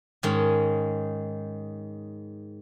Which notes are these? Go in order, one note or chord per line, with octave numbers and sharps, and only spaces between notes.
G#2 D#3 G#3 C#4